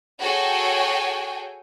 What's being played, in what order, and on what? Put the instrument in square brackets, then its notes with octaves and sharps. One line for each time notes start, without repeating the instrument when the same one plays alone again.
[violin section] F#4 G#4 A4 C#5 G5 G#5